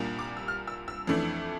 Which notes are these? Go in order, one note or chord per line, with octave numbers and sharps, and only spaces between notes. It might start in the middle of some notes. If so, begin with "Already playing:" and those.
Already playing: C2 A#2 G3 A#3 D4
D6
E6
F6
E6
E6
F2 E3 A3 D4